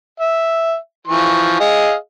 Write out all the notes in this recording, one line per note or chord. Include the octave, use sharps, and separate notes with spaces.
E5
E3 F3 C#6
G#4 D#5 F5